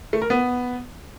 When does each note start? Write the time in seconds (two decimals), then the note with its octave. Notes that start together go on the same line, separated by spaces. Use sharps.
0.13 A3
0.22 A#4
0.30 B3